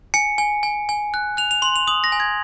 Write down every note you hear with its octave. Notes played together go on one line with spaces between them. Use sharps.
G#5 C#7
G#5
G#5
G#5
F#6
F#6 F7
F7
C6 F#7
F7
D#6 F#7
A#6
G#5
G#6